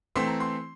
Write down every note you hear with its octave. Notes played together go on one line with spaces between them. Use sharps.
E3 A3 C4 C6
A#5
C6